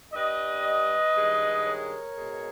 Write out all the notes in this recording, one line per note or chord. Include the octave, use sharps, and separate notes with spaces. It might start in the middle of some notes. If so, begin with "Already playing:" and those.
G2 G3 B4 D#5
G2 D#3 G#3
A#4 C#5
B2 G#3